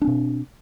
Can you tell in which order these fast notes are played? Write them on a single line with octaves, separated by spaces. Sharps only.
D4 C4 B2